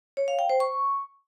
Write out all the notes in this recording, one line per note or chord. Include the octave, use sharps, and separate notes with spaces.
C#5
F5
G5
C5
C#6